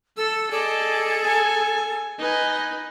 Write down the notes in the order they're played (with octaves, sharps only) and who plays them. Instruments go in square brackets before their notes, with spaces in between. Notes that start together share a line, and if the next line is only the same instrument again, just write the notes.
[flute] A4 [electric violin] E6
[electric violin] G#4 [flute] A4 [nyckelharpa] D5 D#5
[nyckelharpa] G#5
[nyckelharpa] D#4 B4 [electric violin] D#5 G#5